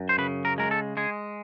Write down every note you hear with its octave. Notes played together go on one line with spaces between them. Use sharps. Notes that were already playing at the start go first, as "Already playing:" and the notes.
Already playing: F#2
C5
C#3 B4
A#4
G#3 A#4
A4
G#3 G#4